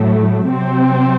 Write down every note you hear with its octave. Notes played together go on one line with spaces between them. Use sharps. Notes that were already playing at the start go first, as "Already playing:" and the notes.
Already playing: A2 F#3 A3
C3 F#3 C4